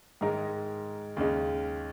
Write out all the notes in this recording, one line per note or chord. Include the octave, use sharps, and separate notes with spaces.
G#2 D#3 G#3 D#4 A#4
D#2 C#3 G#3 D#4